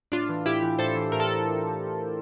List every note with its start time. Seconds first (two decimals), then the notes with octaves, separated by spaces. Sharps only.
0.12 A2 D4 F4
0.29 E3
0.46 A2 E4 G4
0.63 E3
0.79 A2 A4 C5
0.95 E3
1.12 A2 A#4
1.20 A4